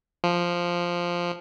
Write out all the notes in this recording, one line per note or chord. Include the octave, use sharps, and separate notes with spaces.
F3